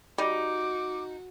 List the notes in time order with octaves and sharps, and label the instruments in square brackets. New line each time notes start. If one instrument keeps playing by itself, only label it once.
[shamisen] G3 [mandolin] D#4 [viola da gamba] F#4 [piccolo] D6